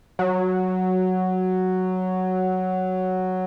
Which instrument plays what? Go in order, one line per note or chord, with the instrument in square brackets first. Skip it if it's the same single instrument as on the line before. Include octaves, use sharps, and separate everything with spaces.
[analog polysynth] F#3